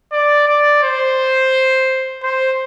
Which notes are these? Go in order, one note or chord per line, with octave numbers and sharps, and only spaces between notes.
D5
D5
C5
C5